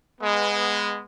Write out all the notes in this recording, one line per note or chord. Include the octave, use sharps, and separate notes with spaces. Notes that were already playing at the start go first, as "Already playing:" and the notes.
G#3 B3